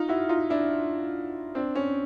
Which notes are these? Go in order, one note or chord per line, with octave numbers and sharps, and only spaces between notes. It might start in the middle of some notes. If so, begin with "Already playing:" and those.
Already playing: D#4 F4
E4 F#4
D#4 F4
D4 E4
C4 D4
C#4